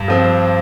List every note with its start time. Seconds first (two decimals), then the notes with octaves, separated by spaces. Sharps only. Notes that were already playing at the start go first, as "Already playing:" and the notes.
Already playing: G2
0.08 F3 C4